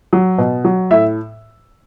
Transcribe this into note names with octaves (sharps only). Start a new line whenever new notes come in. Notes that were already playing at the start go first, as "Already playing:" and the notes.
F#3
B2
F#3
A2 E5